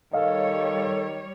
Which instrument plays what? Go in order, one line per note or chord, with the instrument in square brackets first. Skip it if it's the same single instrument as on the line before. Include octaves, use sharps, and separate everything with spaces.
[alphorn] D#3 [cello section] G3 C#5 [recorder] A4 [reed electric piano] D#5 F5